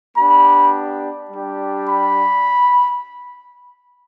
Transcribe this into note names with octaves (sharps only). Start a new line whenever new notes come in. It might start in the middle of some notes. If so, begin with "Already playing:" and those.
B3 D4 G4 B5
G3 D4 G4
B5